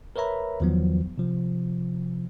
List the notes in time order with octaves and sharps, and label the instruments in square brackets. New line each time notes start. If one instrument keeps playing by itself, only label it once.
[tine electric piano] A#4 B4 C#5 E5 A#5 B5
E2 D#3 F3 F#3 B3
C3 F3